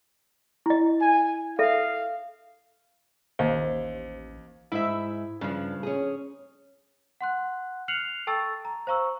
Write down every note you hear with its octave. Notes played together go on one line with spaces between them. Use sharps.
E4 D#5
G#5
A4 E5 F5
A1 D#2 C5
G#2 E4 E5
G2 C#3 F3
C#4 G#4
F#5 C6 F#6
F6 F#6 C7 C#7 F7 F#7
A4 G5 A5 C#6 E6 A6
A#5
C5 F5 A#5 C#6 E6